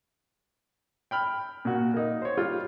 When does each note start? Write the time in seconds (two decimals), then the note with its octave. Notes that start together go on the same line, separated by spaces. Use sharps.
1.11 G5 B5 F6
1.65 A#2 F#4
1.94 A#3 D#4
2.22 C5 C#5
2.37 G3 F4